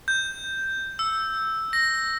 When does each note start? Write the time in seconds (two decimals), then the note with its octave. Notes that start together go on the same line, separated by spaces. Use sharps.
0.08 G6
0.99 E6
1.73 A#6